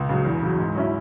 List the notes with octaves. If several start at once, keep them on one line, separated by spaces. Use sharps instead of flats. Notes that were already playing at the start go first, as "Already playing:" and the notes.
Already playing: C#2
C#3 F#3
E2
C#3 F#3
G#2
F#3 C#4 E4